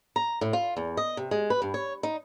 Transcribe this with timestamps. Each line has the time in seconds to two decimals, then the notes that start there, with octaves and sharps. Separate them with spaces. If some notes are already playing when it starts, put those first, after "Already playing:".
0.16 A#5
0.41 A2
0.53 F4
0.77 E2
0.97 D#5
1.17 C3
1.31 G#3
1.50 B4
1.62 G2
1.74 C#5
2.03 D#4